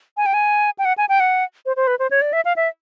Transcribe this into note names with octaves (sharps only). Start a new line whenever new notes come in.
G#5
G5
G#5
G5
F#5
G#5
G5
F#5
C5
C5
B4
C5
C#5
D5
E5
F5
E5